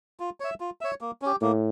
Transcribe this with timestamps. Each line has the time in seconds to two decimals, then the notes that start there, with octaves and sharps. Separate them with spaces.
0.20 F4
0.40 C#5 E5
0.60 F4
0.81 C#5 E5
1.01 A#3
1.22 C#4 G4
1.41 A2 A#3